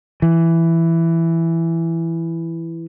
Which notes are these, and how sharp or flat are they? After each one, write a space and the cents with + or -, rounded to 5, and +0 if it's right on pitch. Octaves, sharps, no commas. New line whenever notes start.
E3 +5